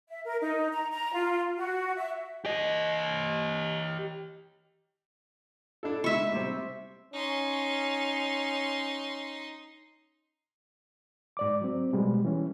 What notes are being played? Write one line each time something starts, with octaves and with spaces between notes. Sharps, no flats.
E5
A#4
D#4
A#5
A#5
F4
F#4
E5
G4 D#5
D4 E4 A4
G#3 D#4 E5 B5 C#6
C3 G3 C4
C#4 D#4 C6
G#2 D5 D6
F#3 C4
B2 G3 G#3
E3 C#4